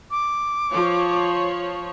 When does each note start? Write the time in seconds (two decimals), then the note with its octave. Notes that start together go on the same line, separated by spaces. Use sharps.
0.11 D6
0.72 F3 C#5